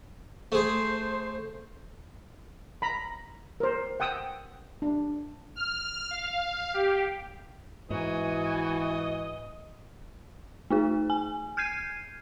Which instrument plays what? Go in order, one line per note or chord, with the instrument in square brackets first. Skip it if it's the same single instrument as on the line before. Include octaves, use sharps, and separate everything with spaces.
[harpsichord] A3 G#4 [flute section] C5
[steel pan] A#5 B5
A#4 C5
F#5 G5 D#6 E6
D4
[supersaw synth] F6
F5
G4
[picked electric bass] G#2 [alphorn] E3 [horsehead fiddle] F#4 G#5 [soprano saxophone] D#5
[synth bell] A3 D#4 G#4
G#5
F6 G6 G#6 C7 D#7